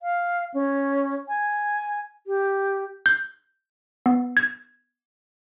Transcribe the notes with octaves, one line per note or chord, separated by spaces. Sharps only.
F5
C#4
G#5
G4
G6
B3
G#6